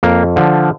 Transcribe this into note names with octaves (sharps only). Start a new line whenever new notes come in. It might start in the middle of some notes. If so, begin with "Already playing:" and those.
F2 A#3
D3 F3